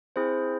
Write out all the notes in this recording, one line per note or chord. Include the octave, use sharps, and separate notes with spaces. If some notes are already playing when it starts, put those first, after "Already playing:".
C4 E4 G#4 C5